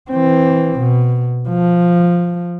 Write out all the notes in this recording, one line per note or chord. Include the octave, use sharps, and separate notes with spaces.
E3 C4
B2
F3